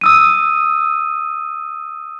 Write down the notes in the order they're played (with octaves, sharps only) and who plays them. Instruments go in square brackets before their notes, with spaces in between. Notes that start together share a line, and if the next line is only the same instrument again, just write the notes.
[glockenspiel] D#6 E6 D#7